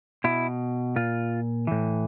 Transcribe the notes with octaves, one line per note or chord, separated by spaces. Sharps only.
B2 E4
A#2 F4
A2 E3